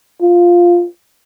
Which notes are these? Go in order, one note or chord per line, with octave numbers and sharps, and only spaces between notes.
F4